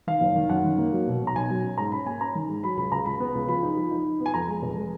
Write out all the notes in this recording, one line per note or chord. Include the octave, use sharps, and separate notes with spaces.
D#3 F5
F#1
D#3
F#2 F#5
D#3
A#3
F#3
B2
B1
A#5
B1 G#5
F#3
C#4
G#2 A#5
C#4 B5
A#3 G#5
C#4 A#5
D#3
G#2
F#3 B5
C#2 B5
C#2 A#5
C#2 B5
B3
C#2
F3 B5
D#4
F3
D#4
D#4
B3
G#5
F2 A#5
G#3
F1
G#3